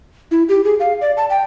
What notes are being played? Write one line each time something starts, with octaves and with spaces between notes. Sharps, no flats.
E4
G4
G#4
F5
D5
A5
G5